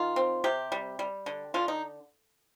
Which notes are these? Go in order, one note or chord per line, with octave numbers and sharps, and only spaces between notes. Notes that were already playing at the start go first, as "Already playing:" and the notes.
Already playing: D#3 F4
C4
C3 G4
G3
G3
D3
D3 F4
D#4